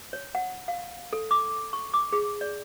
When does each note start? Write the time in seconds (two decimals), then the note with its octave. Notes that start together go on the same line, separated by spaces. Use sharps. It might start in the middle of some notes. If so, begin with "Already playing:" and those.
0.13 C#5
0.35 F#5
0.68 F5
1.13 A4
1.31 D6
1.73 C#6
1.94 D6
2.12 G#4
2.41 D5